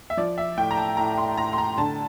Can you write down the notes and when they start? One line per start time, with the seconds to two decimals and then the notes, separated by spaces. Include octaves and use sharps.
0.10 E5
0.17 F3 D5
0.38 E5
0.57 A2 G5
0.71 A#5
0.77 A5
0.97 A2 A#5
1.18 C6
1.37 A2 A#5
1.53 C6
1.58 A#5
1.78 D3 A5